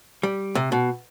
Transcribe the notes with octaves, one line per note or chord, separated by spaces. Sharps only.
G3
C3
B2